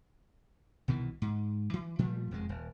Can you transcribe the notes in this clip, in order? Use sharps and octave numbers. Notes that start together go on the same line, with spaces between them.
C2 B2 D#3 E3
G#2
E3
A#2 F3 G3 A3
E1 F2 G#3
D#1